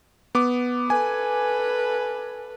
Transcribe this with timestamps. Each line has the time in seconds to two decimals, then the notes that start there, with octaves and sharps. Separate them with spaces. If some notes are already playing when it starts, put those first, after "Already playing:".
0.35 B3 D6
0.90 A4 B4 G#5